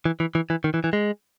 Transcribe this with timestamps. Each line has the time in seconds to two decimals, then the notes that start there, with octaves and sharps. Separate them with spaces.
0.05 E3
0.20 E3
0.35 E3
0.50 E3
0.64 D#3
0.74 E3
0.84 E3
0.93 G#3